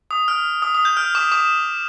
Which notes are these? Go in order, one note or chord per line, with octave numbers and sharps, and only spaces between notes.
D#6
F6
D#6
D#6
G6
F6
D6
D6